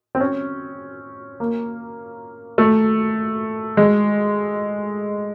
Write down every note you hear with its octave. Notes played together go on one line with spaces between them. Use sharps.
C4
C#4
A#3
A3
G#3